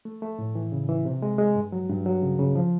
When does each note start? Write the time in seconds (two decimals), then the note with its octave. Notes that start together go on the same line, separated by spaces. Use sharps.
0.05 A3
0.22 A3
0.39 A2
0.55 E3
0.72 C#3
0.89 E3
1.05 C3
1.22 G#3
1.38 G#3
1.56 G2
1.72 F#3
1.89 G2
2.06 F#3
2.22 C#3
2.39 C#3
2.55 F3